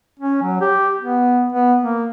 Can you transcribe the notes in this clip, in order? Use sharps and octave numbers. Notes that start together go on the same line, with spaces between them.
C#4
F#3
G4
B3
B3
A#3